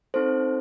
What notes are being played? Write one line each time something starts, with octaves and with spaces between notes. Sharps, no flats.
C4 D#4 A4 C5